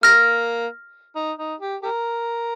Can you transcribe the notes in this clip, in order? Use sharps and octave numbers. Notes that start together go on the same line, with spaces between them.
G3 A#3 F6 A#6
D#4
D#4
G4
G4 A#4